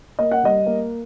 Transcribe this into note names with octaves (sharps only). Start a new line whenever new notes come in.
A#3 D#5
F#5
G3 D#5
A#3